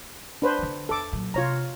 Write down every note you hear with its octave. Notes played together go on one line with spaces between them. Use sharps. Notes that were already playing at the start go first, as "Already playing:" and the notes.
D4 B4 C5
D3 B3
E2 A4 D6
A#2 F#3
C3 F4 C#5 A#5